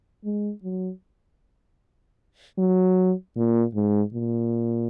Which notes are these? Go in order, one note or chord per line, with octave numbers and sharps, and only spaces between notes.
G#3
F#3
F#3
A#2
G#2
A#2